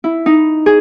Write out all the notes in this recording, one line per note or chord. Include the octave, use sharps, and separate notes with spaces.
E4
D#4
G#4